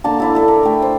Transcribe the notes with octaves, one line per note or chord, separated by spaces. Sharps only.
D3 A#3 A5
D4 E4 A4
E4 A4 D5
A#4
A3 G5
C5